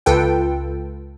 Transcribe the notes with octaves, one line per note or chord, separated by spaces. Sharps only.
C#2 F4 A4 B4 G5